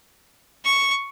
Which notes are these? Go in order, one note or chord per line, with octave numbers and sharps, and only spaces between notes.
C#6